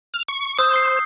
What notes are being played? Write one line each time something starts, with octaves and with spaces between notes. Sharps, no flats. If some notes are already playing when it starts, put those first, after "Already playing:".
F6
C#6
C5 D#6 E6 G6
C7 G7